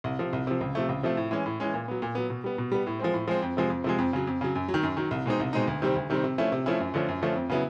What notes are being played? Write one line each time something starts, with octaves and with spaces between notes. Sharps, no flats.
C2
C3 F3
C2
C3 F3
C#2
C3 F3 A3
C#2
C3 F3 A3
A2
E3 G#3 C#4
A2
E3 G#3 C#4
A#2
F#3 B3
A#2
F#3 B3
B2
G3 B3
B2
G3 B3
A2
F3 G#3 C4
A2
F3 G#3 C4
F2
C3 F3 G#3
F2
C3 F3 G#3
F2
C#3 F#3
F2
C#3 F#3
F#2
F#3
D#3
F#2
D#3 F#3
C2
B2 G#3 C4 D#4
C2
B2 G#3 C4 D#4
D2
C3 D#3 G3 C4
D2
C3 D#3 G3 C4
C3
F3 A3 C#4 E4
C3
F3 A3 C#4 E4
F#2
D3 F3 A3 C#4
F#2
D3 F3 A3 C#4
F2
C#3 F#3 B3 E4